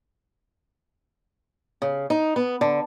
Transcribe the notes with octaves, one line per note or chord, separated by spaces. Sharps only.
C#3
D#4
B3
D3